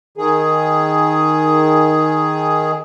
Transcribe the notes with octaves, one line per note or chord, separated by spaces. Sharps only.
D#3 G#4